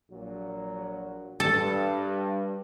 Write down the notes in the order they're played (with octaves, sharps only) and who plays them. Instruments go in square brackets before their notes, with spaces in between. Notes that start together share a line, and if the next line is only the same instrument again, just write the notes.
[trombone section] A#1 A#2 F#3
[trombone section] G2 [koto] A4